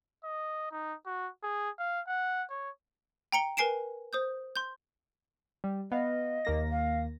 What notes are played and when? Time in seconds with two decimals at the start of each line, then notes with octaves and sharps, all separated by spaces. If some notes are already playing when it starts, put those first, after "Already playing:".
0.24 D#5
0.71 D#4
1.06 F#4
1.43 G#4
1.79 F5
2.07 F#5
2.50 C#5
3.32 G5 A#5 C#7 G7
3.57 A#4 B4 G#5 C7 D7 E7
4.13 C5 D#6 G6
4.56 C6 G6
5.64 G3
5.92 B3 D#5 F5
6.45 D#2 A#3 A#6
6.71 F5